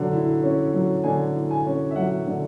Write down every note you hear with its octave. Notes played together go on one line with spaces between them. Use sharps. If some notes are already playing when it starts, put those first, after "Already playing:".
Already playing: D3 F#3
E4
C#4
F#3
D3 G#5
E4
G#5
C#4
E5
F#3 F#5
D3